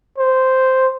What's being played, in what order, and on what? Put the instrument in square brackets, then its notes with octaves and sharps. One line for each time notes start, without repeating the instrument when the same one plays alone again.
[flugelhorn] C5